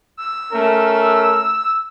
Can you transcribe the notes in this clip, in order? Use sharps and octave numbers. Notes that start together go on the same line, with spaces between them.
E6
A3 C#4 A#4